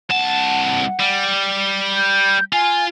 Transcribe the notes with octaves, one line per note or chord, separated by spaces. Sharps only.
C2 F#5 A5
G3
G6
F4 G#5